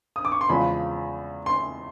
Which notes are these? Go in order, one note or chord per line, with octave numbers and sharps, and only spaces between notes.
D#6
D6
C#6
C6
E2 C#3 F3 G#3 B5
C6